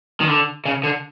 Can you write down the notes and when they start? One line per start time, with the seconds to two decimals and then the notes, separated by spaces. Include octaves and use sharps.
0.21 D#3
0.28 D3
0.65 C#3
0.83 D3